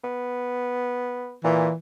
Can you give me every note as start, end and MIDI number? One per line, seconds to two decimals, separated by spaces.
0.04 1.36 59
1.44 1.69 46
1.44 1.74 52